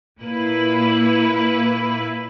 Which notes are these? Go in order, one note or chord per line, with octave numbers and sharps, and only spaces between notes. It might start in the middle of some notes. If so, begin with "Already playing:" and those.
A#2 A#3 E4 B4